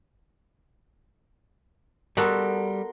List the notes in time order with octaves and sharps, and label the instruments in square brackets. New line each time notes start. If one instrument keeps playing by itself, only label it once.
[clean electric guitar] G3 [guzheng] B3 F#4 A4 [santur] A#4 C6